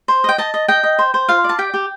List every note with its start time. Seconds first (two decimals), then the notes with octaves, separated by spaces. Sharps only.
0.08 C5
0.24 D#5 G5
0.38 D#5 A5
0.54 D#5
0.68 D#5 G5
0.83 D#5
0.99 C5
1.14 C5
1.29 F4 F5
1.44 D5
1.49 A5
1.59 G4 G5
1.74 G4